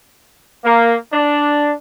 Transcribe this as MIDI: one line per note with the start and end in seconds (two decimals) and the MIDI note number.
0.64 0.95 58
1.12 1.72 62